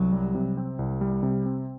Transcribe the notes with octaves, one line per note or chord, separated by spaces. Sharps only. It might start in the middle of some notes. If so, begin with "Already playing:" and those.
Already playing: C2 F#3
G3
C3
C4
C2
G3
C3
C4